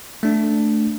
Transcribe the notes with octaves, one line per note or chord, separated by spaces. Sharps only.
A3 D4